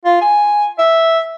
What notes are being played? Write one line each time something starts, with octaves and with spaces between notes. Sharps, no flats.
F4
G#5
E5